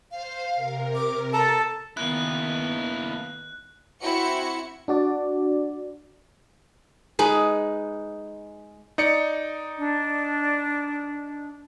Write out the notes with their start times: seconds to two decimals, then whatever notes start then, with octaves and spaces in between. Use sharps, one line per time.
0.11 C5 F5
0.56 C3 A#4
0.95 D6
1.33 A4 A5 A#5
1.97 D#3 A#3 B3 E4 F#6
4.01 C4 E4 F#4 C#7
4.88 D4 F#4 D5
7.19 G#3 D#4 B4
8.98 D#4 D5 C#7
9.78 D4